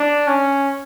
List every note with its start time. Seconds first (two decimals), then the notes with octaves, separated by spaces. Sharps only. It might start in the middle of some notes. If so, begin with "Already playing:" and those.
Already playing: D4
0.28 C#4